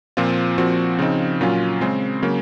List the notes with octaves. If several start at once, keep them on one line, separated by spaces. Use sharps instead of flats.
A#2 F3 C4 F4
A#2 F3 C4 F#4
C#3 F3 C4 D#4
A#2 F#3 C#4 F4
C#3 G#3 C4
C#3 F#3 A#3